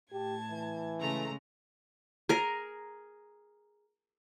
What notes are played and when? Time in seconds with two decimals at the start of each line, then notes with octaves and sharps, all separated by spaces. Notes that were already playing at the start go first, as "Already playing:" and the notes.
0.12 A2 G4 A5 G#6
0.51 E3
1.00 C#3 G#3 A3 A#5
2.29 G#4 A#4